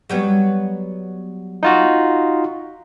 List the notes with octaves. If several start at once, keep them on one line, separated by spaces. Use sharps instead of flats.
F#3 G3 B3
D#4 F4 F#4